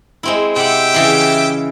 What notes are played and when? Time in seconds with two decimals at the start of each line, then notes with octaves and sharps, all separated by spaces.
0.23 G#3 C4 E4
0.56 C3 G4 E5 F#5 G5
0.94 C#3 E3 E4